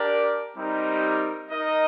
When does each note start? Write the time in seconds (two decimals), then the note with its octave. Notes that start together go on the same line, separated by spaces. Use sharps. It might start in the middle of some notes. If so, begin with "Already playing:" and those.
Already playing: D4 G4 A#4 D5
0.54 G3 C4 D#4 G4 A#4
1.50 D#4 A#4 D#5